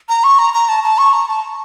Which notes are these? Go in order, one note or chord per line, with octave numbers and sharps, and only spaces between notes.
A#5
C#6
A#5
A#5
A5
A5
C#6
A#5
A5